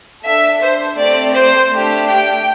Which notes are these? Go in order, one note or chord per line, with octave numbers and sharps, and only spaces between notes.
D4 A4 E5
C5
A3 C4 G4 D5
C5
A3 D4 G4
G5